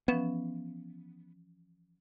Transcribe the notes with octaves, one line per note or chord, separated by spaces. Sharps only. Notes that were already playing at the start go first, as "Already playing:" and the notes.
E3 F3 B3 C#4